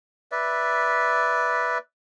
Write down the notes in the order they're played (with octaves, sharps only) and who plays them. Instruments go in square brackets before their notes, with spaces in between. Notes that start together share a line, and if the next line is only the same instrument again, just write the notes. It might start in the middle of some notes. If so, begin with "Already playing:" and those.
[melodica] B4 D5 E5